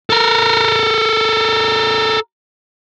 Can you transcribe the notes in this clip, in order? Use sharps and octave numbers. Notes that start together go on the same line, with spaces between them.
A4 A#4